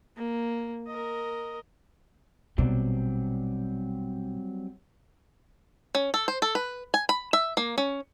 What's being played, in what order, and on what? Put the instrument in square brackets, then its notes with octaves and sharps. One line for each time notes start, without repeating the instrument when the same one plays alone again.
[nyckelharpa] A#3
A#4 D#5
[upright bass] A#1 B2 [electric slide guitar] F#3 G3 C4
[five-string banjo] C#4
A4
C5
A4
B4
G#5
B5
E5
A#3
C#4